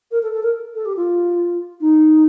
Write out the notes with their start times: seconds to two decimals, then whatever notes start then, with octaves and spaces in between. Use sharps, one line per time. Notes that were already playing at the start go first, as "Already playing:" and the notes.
0.11 A#4
0.22 A4
0.33 A4
0.43 A#4
0.75 A4
0.85 G4
0.96 F4
1.80 D#4